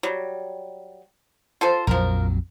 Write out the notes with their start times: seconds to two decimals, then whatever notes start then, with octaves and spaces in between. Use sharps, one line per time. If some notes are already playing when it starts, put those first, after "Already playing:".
0.03 F#3 G3
1.61 F4 A4 C5
1.87 A#1 F2 F3 F#3 A#4